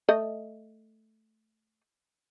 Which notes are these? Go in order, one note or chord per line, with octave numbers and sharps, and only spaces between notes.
A3 D#5